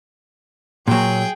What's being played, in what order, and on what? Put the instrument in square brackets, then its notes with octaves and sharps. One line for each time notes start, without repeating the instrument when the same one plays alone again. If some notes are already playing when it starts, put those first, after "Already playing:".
[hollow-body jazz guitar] A#2 F#3 [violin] G#4 G5